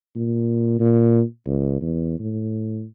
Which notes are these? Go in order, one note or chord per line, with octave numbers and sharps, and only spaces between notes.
A#2
A#2
C#2
E2
A2